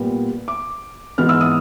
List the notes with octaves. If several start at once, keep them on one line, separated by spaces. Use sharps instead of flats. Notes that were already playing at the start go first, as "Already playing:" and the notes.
Already playing: A#2 G3 B3
D6
G#2 E3 G#3 B3 F6
E6
D#6